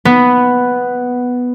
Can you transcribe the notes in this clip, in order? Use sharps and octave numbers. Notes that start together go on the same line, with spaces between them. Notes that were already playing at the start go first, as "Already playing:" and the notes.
B3